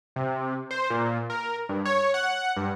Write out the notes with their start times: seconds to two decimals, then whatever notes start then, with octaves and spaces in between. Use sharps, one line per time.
0.16 C3
0.71 C5
0.90 A#2
1.30 A#4
1.69 G2
1.85 C#5
2.14 F#5
2.57 G2